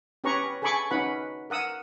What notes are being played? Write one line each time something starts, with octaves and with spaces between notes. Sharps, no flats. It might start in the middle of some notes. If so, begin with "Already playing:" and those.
C#4 G4 B4 C#5 A#5 C#6
G#4 A4 G#5 B5 C#6 D6
C#4 D#4 F#4 B4 F#5 B5
A#4 F#5 D#6 E6